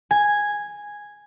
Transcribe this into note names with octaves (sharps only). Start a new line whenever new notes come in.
G#5